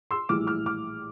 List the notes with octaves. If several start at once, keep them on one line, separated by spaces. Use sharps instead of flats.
C6 E6
A#1 A2 E3 G3 D6 F6
D6 F6
D6 F6